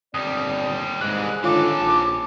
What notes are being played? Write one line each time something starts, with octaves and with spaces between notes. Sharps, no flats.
G1 D#2 G3 C4 D5 D#6
C2 G#2 E3 G#3 F#6
G#1 D3 E3 F4 A4 C#5 D6
A#1